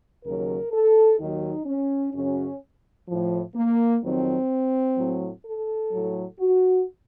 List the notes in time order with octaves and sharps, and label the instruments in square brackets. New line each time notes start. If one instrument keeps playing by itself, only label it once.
[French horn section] D#2 C#3 F#3 A#4
A4
D#2 D#3 F#3 D#4
C#4
F#2 C#3 F#3 C#4
A2 F3
A#3
F2 D#3 F#3 C4
A2 F#3
A4
A2 F#3
F#4